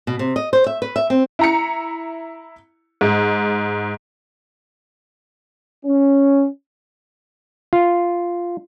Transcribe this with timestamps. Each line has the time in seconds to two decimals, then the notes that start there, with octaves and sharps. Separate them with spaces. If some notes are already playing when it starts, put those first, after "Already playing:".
0.07 B2
0.19 C3
0.36 D#5
0.53 C5
0.66 E5
0.82 B4
0.96 E5
1.10 C4
1.39 E4 A#5 C#7
3.01 G#2
5.85 C#4
7.73 F4